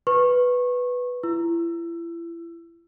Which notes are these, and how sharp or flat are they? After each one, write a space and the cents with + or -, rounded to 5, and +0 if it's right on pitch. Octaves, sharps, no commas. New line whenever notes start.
B4 +0 C#6 -25
E4 +35 E6 +20